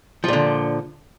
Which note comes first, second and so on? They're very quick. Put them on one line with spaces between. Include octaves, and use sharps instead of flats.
F3 A#2 D3